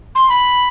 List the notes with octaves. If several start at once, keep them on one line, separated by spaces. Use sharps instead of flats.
C6
B5